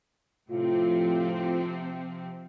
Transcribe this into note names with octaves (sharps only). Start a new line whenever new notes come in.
A2 C3 F3 C4 F4